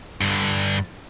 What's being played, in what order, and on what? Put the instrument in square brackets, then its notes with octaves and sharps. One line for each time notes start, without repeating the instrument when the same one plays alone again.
[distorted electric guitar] G2 D3